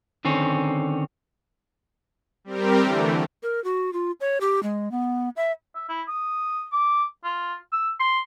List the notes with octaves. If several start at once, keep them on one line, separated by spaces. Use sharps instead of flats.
D3 D#3 C4 C#4
G3 C4 G4 A#4
D3 E3 A3
A#4
F#4
F4
C#5
G4
G#3
B3
E5
E5
E4
D#6
D6
F4
E6
C6